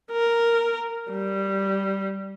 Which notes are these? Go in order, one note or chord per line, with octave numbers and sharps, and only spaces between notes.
A#4
G3